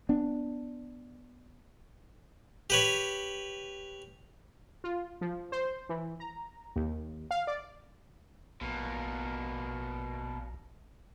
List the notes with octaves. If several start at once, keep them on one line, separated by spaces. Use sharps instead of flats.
B3 D4
G4 B4 C#5
F4
F3
C5
E3
A#5
D#2
F5
D5
A#1 B2 A#3